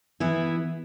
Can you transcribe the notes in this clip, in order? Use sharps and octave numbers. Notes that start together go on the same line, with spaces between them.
E3 B3 E4 G#4